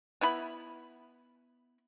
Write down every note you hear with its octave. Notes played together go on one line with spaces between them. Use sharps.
B3 E4 B5